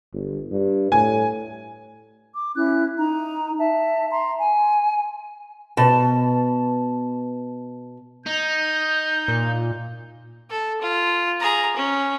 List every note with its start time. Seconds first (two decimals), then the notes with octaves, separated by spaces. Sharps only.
0.13 G1
0.51 G2
0.92 A2 G#5
2.35 D6
2.55 C#4 E4 F#6
2.98 D#4 A#5
3.58 E5 A5
4.11 A#5 C6
4.40 G#5
5.77 B2 A5
8.26 D#4 G6
9.28 A#2
10.50 A4
10.81 F4
11.40 G#4 A#5
11.76 C#4